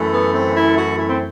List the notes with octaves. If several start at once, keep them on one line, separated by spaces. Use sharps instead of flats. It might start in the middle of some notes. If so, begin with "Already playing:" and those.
Already playing: F#2 E3 A3
B3
C4
E4
F#4
E4
C4